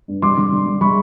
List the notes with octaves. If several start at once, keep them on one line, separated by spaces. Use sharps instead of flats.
G2
G3 C6 D6
D3
D3
G3
G3 B5 C#6